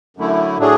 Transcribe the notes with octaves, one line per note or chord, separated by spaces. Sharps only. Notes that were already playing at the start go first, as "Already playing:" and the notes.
F#2 D3 A3 E4
A2 F#3 A3 D4 G#4